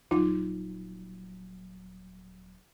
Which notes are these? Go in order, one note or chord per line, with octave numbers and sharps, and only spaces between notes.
D#1 F#3 D#4 F4